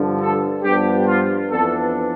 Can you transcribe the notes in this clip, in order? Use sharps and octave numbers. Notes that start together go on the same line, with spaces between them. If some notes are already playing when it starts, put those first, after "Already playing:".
Already playing: G2 D3 F3
A4
G2 F3 B3 D4 G4
F4
F2 E3 B3 D4 A4